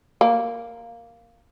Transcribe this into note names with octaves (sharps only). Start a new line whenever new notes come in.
A#3